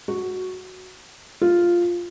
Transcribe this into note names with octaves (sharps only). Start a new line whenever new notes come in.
F#4
F4